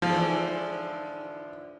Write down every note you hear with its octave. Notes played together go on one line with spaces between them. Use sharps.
G#2 D3 E3 F3